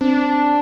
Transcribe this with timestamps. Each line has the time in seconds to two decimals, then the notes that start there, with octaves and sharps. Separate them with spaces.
0.01 C4 D4